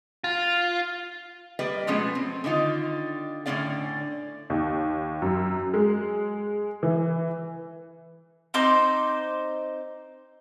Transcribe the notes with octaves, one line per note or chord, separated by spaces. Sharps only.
F4
G3 A#3 B4 D5 D#5
B2 F3 G#3 A3 B3 C#4
C4
D3 D#3 D#4 F4
A2 D3 B3 C#4 D5 F5
D#2
F#2
G#3
E3
C4 D#4 C5 D6